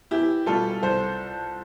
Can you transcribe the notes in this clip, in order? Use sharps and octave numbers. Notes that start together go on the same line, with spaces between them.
E2 E4 G4
B2 G3 F4 A4
C2 A4 C5